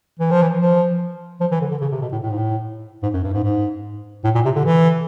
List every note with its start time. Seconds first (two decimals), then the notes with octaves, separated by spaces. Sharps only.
0.19 E3
0.31 F3
0.42 E3
0.59 F3
1.41 F3
1.52 E3
1.61 D3
1.71 D3
1.81 C#3
1.92 C3
2.02 B2
2.12 A2
2.22 A2
2.30 G#2
2.37 A2
3.03 G#2
3.14 F#2
3.24 G2
3.34 G#2
3.44 G#2
4.24 A2
4.35 A#2
4.45 C3
4.56 D3
4.65 E3